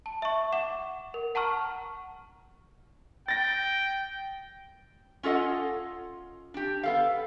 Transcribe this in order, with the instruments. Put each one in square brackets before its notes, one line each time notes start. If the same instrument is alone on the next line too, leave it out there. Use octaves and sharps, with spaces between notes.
[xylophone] A5
E5 C#6
F#5 D6 E7
A#4
F#5 A5 A#5 C#6 F6
[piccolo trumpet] G5 [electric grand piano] A6 A#6
[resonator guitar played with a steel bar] C#4 F4 A4 D#5 F#5
D4 G4
B3 A4 F5